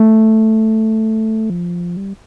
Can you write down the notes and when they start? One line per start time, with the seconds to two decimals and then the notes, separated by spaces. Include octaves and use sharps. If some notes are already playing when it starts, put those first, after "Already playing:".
Already playing: A3
1.50 F3
1.97 G3